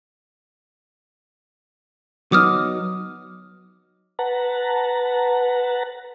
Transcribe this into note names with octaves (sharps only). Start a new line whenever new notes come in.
F#3 B3 D#4 D6 D#6 F6
B4 F#5 A5 A#5